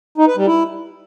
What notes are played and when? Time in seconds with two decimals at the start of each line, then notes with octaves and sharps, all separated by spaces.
0.18 D#4
0.27 B4
0.37 G3
0.47 E4